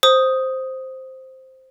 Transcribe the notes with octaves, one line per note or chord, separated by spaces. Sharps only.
C5 D#6